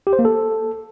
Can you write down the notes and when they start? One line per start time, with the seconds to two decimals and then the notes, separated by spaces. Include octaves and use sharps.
0.07 G4
0.13 C5
0.19 A#3
0.25 A4